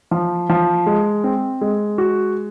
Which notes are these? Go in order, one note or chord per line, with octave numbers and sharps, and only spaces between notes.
F3
F3
G#3
C4
G#3
F#4